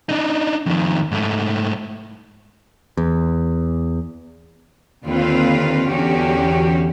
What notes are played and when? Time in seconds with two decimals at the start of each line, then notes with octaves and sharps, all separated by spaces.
0.09 D4 D#4
0.66 F2 D#3
1.11 G#2 A3
2.97 E2
5.05 D#2 D3 C4 F4 B4 F5
5.89 E2 D3 C#4 F#4 G4